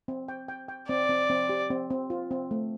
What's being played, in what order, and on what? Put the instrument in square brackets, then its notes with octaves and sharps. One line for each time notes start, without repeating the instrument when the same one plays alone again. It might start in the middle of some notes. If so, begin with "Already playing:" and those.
[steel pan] C4
G5
G5
G5
[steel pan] C4 [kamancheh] D5
[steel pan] C4
C4
G4
C4
C4
F4
C4
A3